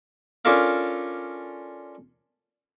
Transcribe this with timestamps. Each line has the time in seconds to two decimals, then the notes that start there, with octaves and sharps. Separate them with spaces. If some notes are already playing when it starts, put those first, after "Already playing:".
0.45 C#4 D4 F4 A4 A#4 F5